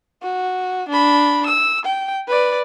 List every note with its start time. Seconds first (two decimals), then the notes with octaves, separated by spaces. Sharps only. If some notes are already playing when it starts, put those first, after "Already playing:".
0.23 F#4
0.88 D4 B5
1.46 E6
1.85 G5
2.28 B4 D5